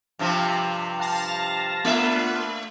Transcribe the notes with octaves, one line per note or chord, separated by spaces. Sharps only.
G2 C3 F3
F5 A5 A#6
A3 B3 D4 F4 E5